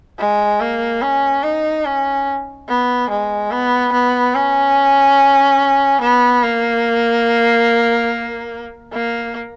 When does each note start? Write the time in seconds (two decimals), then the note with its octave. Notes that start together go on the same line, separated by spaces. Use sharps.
0.19 G#3
0.61 A#3
1.02 C#4
1.44 D#4
1.85 C#4
2.68 B3
3.10 G#3
3.51 B3
3.93 B3
4.35 C#4
6.02 B3
6.44 A#3
8.93 A#3